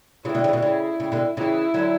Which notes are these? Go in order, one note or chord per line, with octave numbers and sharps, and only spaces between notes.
C#3 E3 E4
B2 D3
C#3 E3
B2 D3
C#3 E4
C#3
B2 D3
C#3 E3 E4
D3 F#3